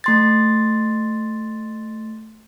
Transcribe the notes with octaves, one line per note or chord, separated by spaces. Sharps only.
A3 C6 A6